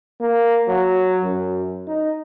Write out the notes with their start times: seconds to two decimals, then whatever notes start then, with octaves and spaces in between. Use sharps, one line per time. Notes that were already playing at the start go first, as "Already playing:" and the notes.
0.21 A#3
0.68 F#3
1.23 F#2
1.87 D#4